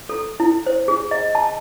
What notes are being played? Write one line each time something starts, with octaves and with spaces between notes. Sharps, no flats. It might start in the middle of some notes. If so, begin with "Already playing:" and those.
A4
E4
C5
G#4
D#5
A5